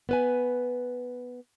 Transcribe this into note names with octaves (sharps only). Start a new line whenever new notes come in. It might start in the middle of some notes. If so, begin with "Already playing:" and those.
B3 B4 G#5